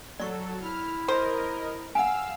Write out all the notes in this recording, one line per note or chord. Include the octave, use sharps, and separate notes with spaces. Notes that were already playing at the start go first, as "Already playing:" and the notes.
F#3 A4 D5 C#6
E4 F6
A#4 C5 D#5
F5 F#5 G#5 E6